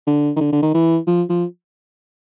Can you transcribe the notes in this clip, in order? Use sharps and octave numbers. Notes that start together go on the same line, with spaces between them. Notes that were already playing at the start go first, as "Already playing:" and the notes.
D3
D#3
D3
D3
D#3
E3
F3
F3